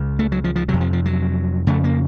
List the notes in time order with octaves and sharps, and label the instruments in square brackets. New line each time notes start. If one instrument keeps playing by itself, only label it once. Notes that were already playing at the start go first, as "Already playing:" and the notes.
Already playing: [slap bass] C#2 C#3
A3
F#3
F3
F3
F2 C3 F#3
F3
F3
F#3
F2 C#3 A3
A#3